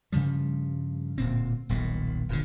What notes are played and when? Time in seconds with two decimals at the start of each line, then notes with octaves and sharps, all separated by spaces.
0.12 G2 C#3 F3 G3
1.18 D1 A#2 C4
1.69 D#1 B1 A#2
2.29 D1 A#2 D3